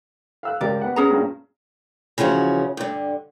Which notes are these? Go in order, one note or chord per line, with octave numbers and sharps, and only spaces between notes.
F5 E6 F#6
C#2 G4 A#4 D5
B3 F#5
C#4 G#4 A#5
G2 A#2
C#3 E3 F3 C#4 F#4
G2 D3